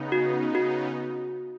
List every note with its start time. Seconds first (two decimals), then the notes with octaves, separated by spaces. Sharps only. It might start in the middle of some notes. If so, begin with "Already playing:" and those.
Already playing: C#3 B3 D#4
0.12 F#4
0.55 F#4